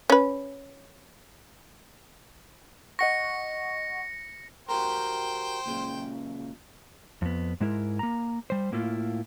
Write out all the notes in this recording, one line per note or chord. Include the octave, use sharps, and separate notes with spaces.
C#4 B4
D#5 F#5 C#6 A#6 C#7
F#4 G4 A#4 C5 G5
C#2 A#2 C#3
F2 B3
G#2 G#3 E4 A#4
A#3 A#5
G3 C5
A2 A#3 E4 F4